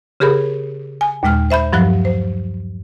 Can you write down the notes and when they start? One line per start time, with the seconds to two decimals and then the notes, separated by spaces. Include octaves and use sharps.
0.20 C#3 G4 G#4 A#4 B5
1.01 G#5
1.23 D#2 A#2 G#3 G5 F6
1.50 C5 E5 B5 G6
1.73 G2 F3 F#3 F#6
2.05 C5